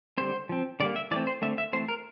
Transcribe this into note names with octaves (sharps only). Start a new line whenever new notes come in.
D3 G3 C4 C5
F3 C4
D3 G3 A#3 D5
E5
E3 A3 C4 D5
C5
D3 A3 C4 E5
E5
E3 A3 C4 C5
A#4